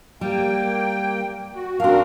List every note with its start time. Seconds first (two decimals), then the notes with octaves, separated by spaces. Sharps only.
0.21 G3 A#3 G5
1.55 F#4
1.80 C4 D4 F#4 A#4 F5